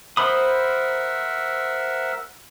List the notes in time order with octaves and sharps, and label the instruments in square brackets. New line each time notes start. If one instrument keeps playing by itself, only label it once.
[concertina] A#4 E5 F#5 [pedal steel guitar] C5 B5 D#6